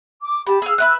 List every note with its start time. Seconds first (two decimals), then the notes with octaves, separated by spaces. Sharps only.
0.22 D6
0.47 G4 A5 B5
0.62 G#4 F5 E6
0.78 B4 E5 F#6